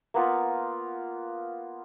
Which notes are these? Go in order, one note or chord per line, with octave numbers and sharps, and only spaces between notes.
A#3 B3 F4